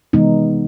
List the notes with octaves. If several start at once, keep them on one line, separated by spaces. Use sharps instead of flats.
C3 E3 G#3 B3 D#4